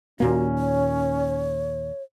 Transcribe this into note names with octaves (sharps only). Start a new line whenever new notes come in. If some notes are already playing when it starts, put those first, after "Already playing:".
D#2 A#2 A#3 C#4 F#4
C#5